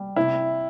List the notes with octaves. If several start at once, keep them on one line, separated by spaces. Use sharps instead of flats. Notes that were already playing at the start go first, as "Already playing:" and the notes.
Already playing: G3
C3 E4